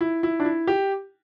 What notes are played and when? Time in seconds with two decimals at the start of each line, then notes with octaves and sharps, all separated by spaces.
0.01 E4
0.23 E4
0.40 D4
0.45 E4
0.68 G4